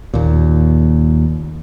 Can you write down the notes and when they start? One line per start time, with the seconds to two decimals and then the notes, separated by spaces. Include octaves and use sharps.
0.14 D#2 A#2